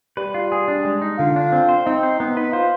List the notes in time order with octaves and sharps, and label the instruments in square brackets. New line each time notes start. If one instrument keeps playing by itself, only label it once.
[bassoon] G3 [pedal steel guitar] B4
[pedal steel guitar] F4
G#4
D4
G#3
D#4
[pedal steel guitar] D3 [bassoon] F4
[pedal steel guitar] D4
C4
C5
[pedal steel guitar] C4 [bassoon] D#4
[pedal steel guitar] C5
[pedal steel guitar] B3 [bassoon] D#4
[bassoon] D#4 [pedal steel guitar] B4
[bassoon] F4 [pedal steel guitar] C5